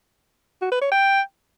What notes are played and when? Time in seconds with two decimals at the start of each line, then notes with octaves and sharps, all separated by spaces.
0.62 F#4
0.72 B4
0.82 C#5
0.92 G5